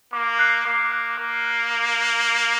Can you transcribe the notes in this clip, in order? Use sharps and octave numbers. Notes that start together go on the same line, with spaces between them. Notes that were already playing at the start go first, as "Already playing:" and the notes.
A#3 D6
F#6 C7
A#3 D6
F#6 C7
A#3 D6
F#6 C7
D6
F#6 C7
G6